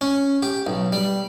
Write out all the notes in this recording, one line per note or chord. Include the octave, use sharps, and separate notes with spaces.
C#4
G4
B1
G3